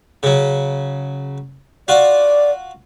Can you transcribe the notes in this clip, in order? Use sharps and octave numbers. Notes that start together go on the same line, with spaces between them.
C#3 F#3
F4 F#4 D5